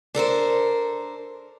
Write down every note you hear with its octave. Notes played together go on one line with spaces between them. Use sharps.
D4 A4 A#4 C5